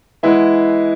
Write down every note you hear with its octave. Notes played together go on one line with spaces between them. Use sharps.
E3 G#3 B3 E4